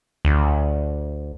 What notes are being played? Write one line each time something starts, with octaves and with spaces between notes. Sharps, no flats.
D2